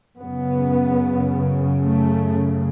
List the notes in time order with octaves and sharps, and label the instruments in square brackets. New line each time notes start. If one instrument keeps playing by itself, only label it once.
[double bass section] F#2 C#3 B3
A3